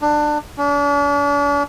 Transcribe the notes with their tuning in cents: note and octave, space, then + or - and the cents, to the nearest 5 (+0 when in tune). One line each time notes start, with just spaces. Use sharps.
D4 +20
D4 -45